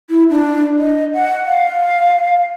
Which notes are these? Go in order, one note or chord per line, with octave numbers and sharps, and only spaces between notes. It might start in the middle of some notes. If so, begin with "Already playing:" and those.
E4
D4
D#5
F#5
F5